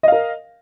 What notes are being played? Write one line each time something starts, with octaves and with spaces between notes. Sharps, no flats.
A#4 D#5 F5